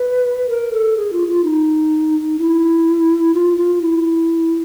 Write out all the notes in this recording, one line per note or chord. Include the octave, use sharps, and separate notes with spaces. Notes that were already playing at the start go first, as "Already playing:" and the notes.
Already playing: B4
A#4
A4
G#4
F4
F4
D#4
E4
F4
F4
E4